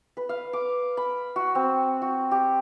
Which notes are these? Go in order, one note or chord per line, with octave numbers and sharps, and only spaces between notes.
B4
F5
D6
B5
F#4
C4
F#4
G4